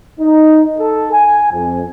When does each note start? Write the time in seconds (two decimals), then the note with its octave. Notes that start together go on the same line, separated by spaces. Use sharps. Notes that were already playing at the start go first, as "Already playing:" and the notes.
0.20 D#4
0.79 A4
1.12 G#5
1.52 F2